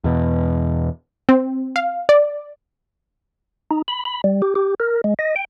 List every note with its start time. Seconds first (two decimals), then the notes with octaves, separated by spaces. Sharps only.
0.04 E2 B2
1.29 C4
1.76 F5
2.09 D5
3.71 D#4
3.88 B5
4.05 B5
4.24 G3
4.42 G4
4.55 G4
4.80 A#4
5.04 G#3
5.19 D#5
5.36 G5